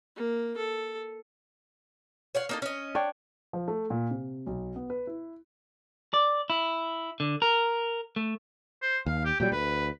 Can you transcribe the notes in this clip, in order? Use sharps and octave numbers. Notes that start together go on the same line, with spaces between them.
A#3
A4
C#5 F5 F#5
A#3 D#4 A4
C#4 D#5
D4 C#5 G5
F3
A3
A#2
C3
B1
B3
B4
E4
D5
E4
D3
A#4
A3
C5
D#2 F5
G4
A#2 F#3 G3 G5
D2 B4